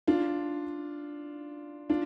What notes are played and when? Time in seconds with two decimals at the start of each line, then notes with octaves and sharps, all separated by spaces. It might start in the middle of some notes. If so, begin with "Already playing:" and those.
0.08 D4 F4
1.90 D4 F4